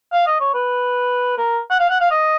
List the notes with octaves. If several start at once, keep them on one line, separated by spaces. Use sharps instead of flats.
F5
D#5
C#5
B4
A#4
F#5
F5
F#5
F5
D#5